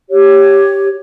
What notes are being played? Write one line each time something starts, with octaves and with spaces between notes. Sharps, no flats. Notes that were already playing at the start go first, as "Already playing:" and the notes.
G4 C#5